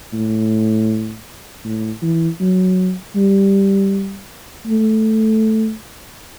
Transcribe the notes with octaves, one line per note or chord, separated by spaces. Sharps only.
A2
A2
E3
F#3
G3
A3